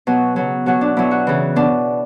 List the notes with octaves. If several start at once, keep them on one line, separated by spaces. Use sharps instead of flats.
B2 F#3
C#3 F#3
B2 F#3 F#4
D4
B2 F#3 E4
F#4
C#3 E3
B2 D4